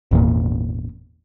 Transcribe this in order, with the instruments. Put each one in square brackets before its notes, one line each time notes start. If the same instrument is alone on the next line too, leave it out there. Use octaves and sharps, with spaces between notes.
[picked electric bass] G#1 E2 A#2